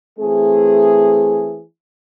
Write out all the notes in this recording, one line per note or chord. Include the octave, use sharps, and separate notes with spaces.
E3 A3 C4 G#4